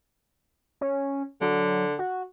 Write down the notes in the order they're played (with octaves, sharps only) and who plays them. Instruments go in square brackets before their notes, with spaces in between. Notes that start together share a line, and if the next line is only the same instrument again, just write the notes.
[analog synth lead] C#4
[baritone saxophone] D3 [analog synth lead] F#3
[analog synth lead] F#4